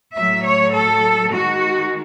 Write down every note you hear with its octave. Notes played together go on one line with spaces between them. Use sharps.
A2 F#3 A3 E5
C#5
A4
D#3 G#3 F#4